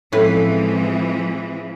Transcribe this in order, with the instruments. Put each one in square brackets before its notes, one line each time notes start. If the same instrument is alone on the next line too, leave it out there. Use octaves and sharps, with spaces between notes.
[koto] A2 C#4 B4 [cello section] E3 F3 G#3 [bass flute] C4